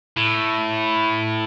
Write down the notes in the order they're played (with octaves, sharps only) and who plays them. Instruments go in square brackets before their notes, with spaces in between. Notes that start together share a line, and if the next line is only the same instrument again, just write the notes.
[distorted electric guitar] A2